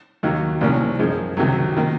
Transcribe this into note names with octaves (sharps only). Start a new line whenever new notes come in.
D#2 D#3 F#3
C2 A#2 F3 A#3 C#4
F#2 F3 G#3 D#4
C#2 C3 D#3 F#3
D#3 A#3